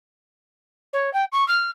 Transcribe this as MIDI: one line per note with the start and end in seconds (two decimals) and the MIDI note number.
0.93 1.12 73
1.13 1.24 79
1.32 1.47 85
1.48 1.70 89